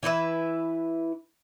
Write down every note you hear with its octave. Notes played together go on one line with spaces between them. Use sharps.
E3 E4 B4 E5